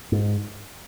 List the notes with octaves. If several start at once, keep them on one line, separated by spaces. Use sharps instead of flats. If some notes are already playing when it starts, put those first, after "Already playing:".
G#2